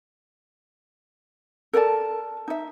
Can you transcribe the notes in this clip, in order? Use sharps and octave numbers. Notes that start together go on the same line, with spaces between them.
A4 A#4 D5 A5
D#4 E5